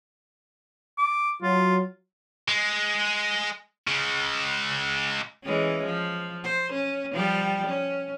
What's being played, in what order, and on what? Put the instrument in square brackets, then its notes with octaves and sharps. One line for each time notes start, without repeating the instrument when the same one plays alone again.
[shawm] D6
[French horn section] F#3 [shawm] F4
[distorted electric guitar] G#3
C#3 G#3
[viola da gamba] E3 G#3 C#4
F3
C5
C#4
F3 G3 G4
C#4